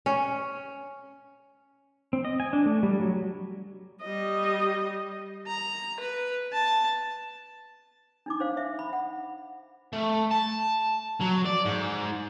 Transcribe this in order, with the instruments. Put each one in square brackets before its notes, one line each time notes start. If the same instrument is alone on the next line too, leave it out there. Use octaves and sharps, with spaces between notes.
[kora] C#4
[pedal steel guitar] C4
D#5
G#5
D4
A3
G3
F#3
[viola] G3 D#5
[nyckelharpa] A#5
B4
A5
[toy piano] D4 D#4 D6
D4 C5 F5
E5
B5
F#5
[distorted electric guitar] A3
A5
F#3
D5
G#2